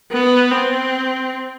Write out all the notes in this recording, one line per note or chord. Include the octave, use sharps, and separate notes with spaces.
B3
C4